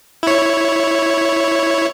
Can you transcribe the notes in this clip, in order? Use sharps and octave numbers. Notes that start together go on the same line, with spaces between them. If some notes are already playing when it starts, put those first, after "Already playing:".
E4 C#5